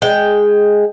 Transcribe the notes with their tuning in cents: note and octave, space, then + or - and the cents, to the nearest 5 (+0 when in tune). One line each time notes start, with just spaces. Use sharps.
G#3 +0 G5 +0